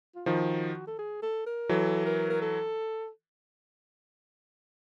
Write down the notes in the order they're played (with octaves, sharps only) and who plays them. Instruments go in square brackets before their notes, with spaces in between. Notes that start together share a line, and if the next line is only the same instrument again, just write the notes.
[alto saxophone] F4
[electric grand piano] D#3 F3 [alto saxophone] F#4
[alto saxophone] A4
G#4
A4
A#4
[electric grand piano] E3 F#3 [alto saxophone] A4
[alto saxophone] A#4
A#4
A4